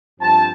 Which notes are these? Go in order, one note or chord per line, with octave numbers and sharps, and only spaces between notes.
G2 F3 C4 A5